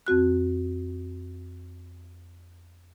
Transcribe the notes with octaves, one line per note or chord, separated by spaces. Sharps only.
F2 C4 F#4 F#6